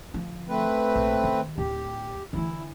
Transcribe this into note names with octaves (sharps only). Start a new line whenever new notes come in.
D3 F3
A3 C4 B4
A#1
D#3
D1 G4
D3 E3 E4